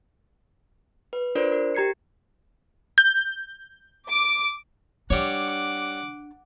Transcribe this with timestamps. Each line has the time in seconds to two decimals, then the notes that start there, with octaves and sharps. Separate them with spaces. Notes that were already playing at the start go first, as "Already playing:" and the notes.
1.13 B4
1.35 D4 F4 A#4 C5 D5
1.52 A#4
1.75 G4 A#5 G#6 C7 C#7
2.98 G6
4.08 D6
5.10 G3 D4 C#5 F#5 D6